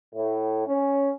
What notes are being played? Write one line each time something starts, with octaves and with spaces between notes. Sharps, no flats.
A2
C#4